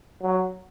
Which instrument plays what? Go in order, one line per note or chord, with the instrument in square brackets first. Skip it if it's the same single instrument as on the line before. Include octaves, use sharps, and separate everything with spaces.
[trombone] F#3